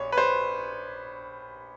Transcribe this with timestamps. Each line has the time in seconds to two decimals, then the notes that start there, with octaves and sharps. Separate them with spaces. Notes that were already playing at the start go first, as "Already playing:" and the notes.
Already playing: A#1 C#5
0.12 B4
0.18 C5